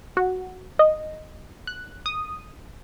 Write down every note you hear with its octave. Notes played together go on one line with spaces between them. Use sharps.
F#4
D#5
F#6
D#6